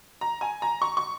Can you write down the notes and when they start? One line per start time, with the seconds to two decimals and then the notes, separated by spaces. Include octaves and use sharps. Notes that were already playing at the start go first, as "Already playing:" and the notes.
0.21 A#5
0.41 G#5
0.62 A#5
0.82 C#6
0.97 C#6